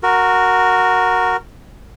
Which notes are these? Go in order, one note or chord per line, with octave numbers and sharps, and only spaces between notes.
F#4 A#4